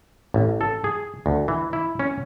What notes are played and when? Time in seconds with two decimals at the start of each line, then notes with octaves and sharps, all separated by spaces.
0.34 A1
0.61 A4
0.84 G#4
1.26 D2
1.48 E3
1.73 E4
1.99 C#4